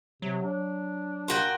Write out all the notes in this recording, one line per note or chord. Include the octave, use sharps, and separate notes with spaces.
C3 F#3
D4
A#2 F#4 G5